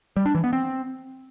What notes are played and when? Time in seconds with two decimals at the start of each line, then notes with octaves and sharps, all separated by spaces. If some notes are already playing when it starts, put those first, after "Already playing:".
0.17 G3
0.26 D4
0.35 E3
0.44 B3
0.53 C4